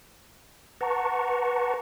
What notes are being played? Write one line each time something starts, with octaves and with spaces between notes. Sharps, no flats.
B4 F#5 A5 A#5 C#6